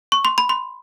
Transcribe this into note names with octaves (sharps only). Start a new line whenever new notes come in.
C#6
C6
B5
C6